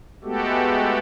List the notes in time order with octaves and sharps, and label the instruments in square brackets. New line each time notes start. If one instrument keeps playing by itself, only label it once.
[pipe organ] G#3 A3 B3 F#4 G4 A4